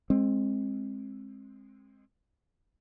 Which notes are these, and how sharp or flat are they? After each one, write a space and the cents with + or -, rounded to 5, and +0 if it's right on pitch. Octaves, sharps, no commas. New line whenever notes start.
G#3 +0 C4 +25